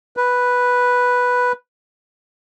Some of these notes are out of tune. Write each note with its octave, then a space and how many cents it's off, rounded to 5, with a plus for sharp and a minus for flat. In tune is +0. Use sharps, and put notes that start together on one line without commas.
B4 -5